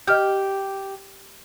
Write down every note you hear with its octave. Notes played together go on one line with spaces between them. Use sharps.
G4 D#5 F6 G6